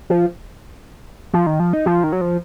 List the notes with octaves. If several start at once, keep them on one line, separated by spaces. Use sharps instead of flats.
F3
F3
D#3
F3
D#4
F3
D#3
F#3
F3